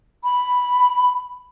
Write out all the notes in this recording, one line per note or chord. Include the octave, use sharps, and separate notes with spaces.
B5